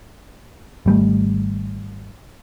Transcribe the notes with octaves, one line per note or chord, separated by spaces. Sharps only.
G#1 G3 A3